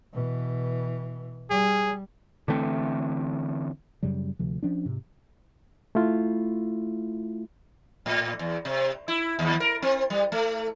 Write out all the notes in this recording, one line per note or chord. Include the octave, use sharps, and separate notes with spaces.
B2 E3
G3 G#4
D3 E3 A3 C4
F#2 C#3 F#3 G3
D2 C3 F3
F3 C#4 D4
G#2 C3
A3 E4 F4
A2
E2
C3
E4
D#2
A#4
C4
G3
A3